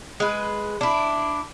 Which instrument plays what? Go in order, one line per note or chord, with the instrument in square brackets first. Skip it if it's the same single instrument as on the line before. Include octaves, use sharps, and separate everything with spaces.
[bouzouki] G#3 B4
D4 E4